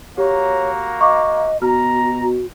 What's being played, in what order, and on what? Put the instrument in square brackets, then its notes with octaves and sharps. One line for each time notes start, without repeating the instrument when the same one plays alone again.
[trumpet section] A#3 F#4 A#5 [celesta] G4 [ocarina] C#5
[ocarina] D#5 [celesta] F5 C#6 D6
[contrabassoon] B2 [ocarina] F#4 [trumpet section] A#5 [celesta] F6